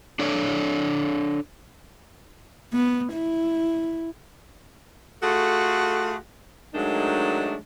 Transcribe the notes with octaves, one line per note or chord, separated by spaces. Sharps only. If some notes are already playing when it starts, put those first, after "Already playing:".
D4 A4 C#5 D5
B3
E4
A3 F4 F#4 G#4 A4
D#3 F#3 G#3 A3 D4 D#4